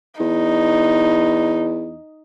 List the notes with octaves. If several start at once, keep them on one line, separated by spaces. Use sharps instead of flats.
E2 D#4